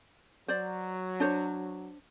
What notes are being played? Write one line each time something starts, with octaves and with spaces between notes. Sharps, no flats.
F#3 C5 D5
D4 C5 C#5